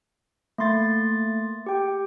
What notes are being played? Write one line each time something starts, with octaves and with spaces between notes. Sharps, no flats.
A3 A#3 C6 A6
G4 G5